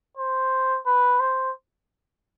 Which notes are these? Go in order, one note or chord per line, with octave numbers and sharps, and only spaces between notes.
C5
B4
C5